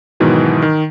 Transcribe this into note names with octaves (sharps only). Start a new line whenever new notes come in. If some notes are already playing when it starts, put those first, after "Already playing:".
G#2 B2 D#3 E3 F#3
D#3